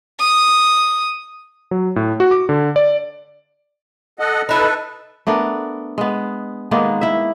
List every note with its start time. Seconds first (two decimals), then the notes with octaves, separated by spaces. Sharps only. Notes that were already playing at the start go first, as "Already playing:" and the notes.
0.19 D#6
1.71 F#3
1.96 A2
2.20 F#4
2.31 D6
2.49 D3
2.76 D5
4.19 A4 D#5 F#5
4.49 D#4 E4 A4 B4
5.27 A3 B3 D4 A#4
5.98 G#3 B3
6.71 D#3 G#3 A#3 B3
7.01 E4 E5